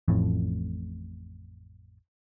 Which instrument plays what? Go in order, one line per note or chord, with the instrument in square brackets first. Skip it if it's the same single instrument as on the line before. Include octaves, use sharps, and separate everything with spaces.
[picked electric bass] A1 F2 A2